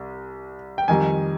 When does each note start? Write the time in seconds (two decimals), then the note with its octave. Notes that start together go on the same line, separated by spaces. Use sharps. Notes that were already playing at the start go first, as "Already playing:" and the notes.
Already playing: C2
0.78 G5
0.88 F2 D#3 G3 G#5